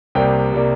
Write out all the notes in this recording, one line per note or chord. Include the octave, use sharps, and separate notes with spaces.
C2 C3 G3 A#3 G5
C3 G3 A#3